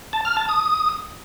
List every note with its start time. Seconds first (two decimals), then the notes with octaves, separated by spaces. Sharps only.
0.13 A5
0.25 F6
0.37 A5
0.49 D#6